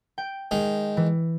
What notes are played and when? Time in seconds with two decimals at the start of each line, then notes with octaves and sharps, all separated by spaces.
0.18 G5
0.51 D#3 G#3
0.97 E3